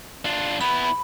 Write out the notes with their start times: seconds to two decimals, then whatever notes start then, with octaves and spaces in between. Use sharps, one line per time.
0.25 D4 F4
0.61 B3 E4 B5